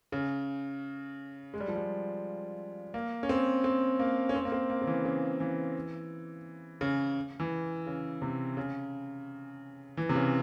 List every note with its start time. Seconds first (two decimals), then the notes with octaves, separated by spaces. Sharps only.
0.12 C#3
1.54 G#3
1.60 G3
1.68 F3
1.76 G3
2.94 A#3
3.23 C#4
3.29 C4
3.64 C4
3.99 A#3
4.29 C#4
4.35 C4
4.45 A#3
4.52 C4
4.70 A#3
4.81 C#3
4.87 E3
5.05 C#3
5.40 E3
6.81 C#3
7.40 E3
7.87 C#3
8.22 C3
8.57 C#3
9.97 E3
10.09 C3
10.15 C#3